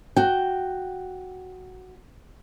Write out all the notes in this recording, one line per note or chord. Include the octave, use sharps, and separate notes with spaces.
F#4 G5